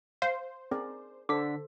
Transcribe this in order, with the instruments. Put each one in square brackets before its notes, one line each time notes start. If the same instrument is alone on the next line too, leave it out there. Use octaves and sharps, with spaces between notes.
[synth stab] C5 [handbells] F5 C7
[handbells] C4 [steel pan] G#4 A#4 D5
[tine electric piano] D3 B6 [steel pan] A4 C5 [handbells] D6